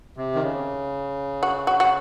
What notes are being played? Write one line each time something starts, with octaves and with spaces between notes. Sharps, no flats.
C3
D#3
C#3
F#4
F#4
F#4